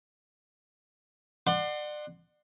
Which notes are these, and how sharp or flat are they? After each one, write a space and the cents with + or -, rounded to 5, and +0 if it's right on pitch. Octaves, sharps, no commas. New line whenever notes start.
D5 +35 F#5 +0 C6 +5